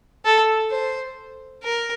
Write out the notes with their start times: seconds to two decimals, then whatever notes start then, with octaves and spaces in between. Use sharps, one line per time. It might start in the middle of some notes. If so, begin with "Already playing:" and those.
0.25 A4
0.71 C5
1.63 A#4